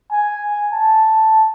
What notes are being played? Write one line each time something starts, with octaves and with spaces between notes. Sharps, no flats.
G#5
A5